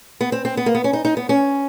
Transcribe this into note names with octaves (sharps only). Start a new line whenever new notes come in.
B3
C4
C4
B3
A#3
B3
C#4
D#4
D#4
B3
C#4